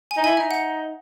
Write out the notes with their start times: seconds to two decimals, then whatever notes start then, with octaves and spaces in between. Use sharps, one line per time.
0.11 G#5
0.17 D#4
0.24 E4 G#5
0.37 D#4 E5
0.51 F#5